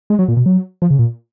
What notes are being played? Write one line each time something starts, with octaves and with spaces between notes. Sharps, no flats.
G#3
F#3
A#2
B2
F#3
F3
C#3
A#2